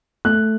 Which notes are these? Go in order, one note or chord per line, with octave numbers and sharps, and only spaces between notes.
A3 F#6